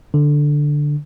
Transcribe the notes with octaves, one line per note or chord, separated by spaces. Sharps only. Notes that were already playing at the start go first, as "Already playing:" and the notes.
D3